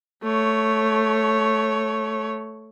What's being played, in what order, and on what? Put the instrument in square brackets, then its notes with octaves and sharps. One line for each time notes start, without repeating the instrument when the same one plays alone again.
[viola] A3 C#5